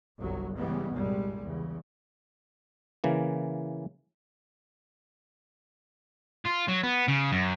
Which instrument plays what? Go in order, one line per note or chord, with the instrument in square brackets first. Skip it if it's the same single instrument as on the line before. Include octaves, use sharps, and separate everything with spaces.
[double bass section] G1 C2 G2 F#3
C#3 E3 G3 G#3 B3
C2 G2 A#2 G3 G#3
E2 C#3
[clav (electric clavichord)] C#3 E3 A#3
[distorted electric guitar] F4
F#3
B3
C#3
F#2